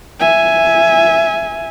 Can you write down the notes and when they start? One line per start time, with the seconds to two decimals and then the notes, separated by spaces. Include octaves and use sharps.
0.20 E5 G#5